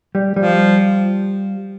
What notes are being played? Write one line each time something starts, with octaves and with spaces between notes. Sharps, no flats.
G3
F3 G3